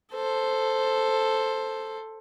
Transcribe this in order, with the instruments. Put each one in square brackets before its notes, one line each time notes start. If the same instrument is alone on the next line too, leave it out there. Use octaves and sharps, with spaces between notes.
[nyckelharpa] A4 C5